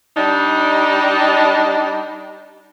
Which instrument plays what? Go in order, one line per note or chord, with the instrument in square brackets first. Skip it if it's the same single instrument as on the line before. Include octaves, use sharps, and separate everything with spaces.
[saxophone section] G3 D4 D#4